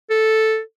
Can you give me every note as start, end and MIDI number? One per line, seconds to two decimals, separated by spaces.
0.10 0.59 69